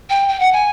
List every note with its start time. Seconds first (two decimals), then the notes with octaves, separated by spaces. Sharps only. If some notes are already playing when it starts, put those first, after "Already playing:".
0.10 G5
0.29 G5
0.40 F#5
0.53 G#5